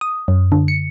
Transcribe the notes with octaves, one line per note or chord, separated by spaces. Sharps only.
D#6
F#2
D3
C#7